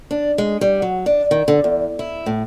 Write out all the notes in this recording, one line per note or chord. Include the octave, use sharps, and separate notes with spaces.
D4
G#3
G3
F#3
D4
D#3
D3
E2
E4
A2